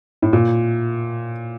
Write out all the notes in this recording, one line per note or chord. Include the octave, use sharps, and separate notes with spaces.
A2
A#2